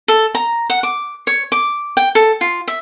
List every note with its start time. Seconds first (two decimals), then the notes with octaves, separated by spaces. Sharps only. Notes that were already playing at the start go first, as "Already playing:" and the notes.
0.08 A4
0.35 A#5
0.70 F#5
0.83 D6
1.27 C#5
1.52 D6
1.97 G5
2.15 A4
2.41 F4
2.68 E5